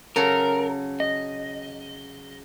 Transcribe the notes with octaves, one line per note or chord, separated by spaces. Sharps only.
C#3 F#3 A4 A#4
D#5